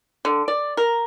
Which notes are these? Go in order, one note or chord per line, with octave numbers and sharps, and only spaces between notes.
D3
D5
A#4